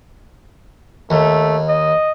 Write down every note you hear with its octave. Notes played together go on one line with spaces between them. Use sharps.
D#2 A3
D#5